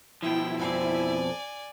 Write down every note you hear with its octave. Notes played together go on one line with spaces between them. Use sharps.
B2 F3 E4 G5
F2 C4 D5 G#5